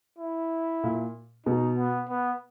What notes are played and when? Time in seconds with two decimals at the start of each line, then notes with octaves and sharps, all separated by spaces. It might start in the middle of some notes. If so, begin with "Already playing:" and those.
0.19 E4
0.83 A#2
1.46 B2 D#4
1.78 B3
2.09 B3